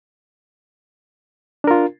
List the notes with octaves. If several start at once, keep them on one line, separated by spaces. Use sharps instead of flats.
D4 F4 A#4